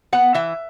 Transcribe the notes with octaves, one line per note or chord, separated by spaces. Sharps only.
B3 F#5
E3 E5